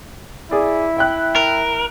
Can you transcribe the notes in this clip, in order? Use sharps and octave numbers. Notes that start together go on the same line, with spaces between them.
E4 G#4 D5
E5 G5 F#6
A#4